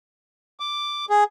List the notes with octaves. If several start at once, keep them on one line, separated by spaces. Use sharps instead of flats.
D6
G#4